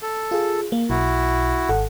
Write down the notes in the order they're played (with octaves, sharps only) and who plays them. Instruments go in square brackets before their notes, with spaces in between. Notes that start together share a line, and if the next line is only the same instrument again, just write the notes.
[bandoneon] A4
[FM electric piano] F4 G#4
A#3
[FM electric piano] B1 [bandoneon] E4 F#4
[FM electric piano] G#1 A4 F#5